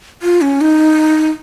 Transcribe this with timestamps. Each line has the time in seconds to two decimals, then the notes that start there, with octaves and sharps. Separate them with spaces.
0.22 F4
0.41 C#4
0.61 D#4